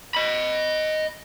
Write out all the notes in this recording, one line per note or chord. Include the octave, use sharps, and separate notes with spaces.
D#5 B5